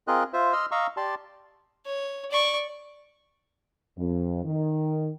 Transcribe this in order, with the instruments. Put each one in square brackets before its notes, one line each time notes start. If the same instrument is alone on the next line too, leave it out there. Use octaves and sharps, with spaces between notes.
[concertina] C4 F4 G#4 A#4 D#5 F#6
F4 C5 E5
D#5 C6 E6 F6
D#5 F5 A#5 C#6 E6
G4 D5 A5 C6
[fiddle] C#5
D5 C#6
[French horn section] F2
D#3